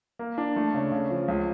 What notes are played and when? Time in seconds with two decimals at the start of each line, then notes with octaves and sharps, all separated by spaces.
0.19 A#3
0.38 D4
0.56 A3
0.74 C#3
0.92 C#3
1.11 F3
1.28 C#2